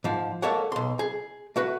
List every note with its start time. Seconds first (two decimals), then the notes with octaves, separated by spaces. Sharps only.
0.04 G#2 F3
0.42 G#3 A#3 A4 C#5 F#5
0.72 B1 C6
0.99 G#4
1.56 A3 F#4 B4